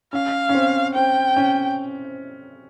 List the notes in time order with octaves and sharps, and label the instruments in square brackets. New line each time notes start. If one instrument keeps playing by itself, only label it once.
[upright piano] C#4 [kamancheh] F5
[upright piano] C#4
C4
[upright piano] C4 [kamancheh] G5
[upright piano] C#4